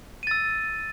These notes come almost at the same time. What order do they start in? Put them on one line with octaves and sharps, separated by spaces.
D#7 A6 E6